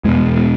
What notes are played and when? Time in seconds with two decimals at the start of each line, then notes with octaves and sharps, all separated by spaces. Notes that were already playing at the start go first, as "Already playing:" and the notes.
0.04 E2 B2 G#3